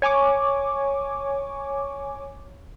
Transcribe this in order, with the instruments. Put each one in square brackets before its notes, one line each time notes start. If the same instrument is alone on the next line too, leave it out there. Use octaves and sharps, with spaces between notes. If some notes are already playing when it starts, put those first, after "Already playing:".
[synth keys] C#5 G#5 C#6 D6